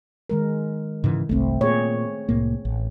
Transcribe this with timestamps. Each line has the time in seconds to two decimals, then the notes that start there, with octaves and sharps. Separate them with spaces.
0.29 D#3 G#3 A#4
1.04 G#2 C#3 E3
1.29 G1 C2 A3 C4
1.61 A#2 G#4 C#5
2.29 C2 A2 A#3
2.65 A1